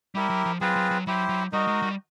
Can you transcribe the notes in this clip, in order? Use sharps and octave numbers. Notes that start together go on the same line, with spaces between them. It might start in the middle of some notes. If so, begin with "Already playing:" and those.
G3 E4 G4 A#4
F#3
F3
F#3 C4 F4 G#4 B4
F#3
F#3
F#3 E4 G4 C5
F#3
G3 D#4 F#4 A#4 D#5
G#3
G3